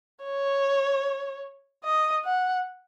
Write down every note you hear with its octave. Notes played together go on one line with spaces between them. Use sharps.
C#5
D#5
F#5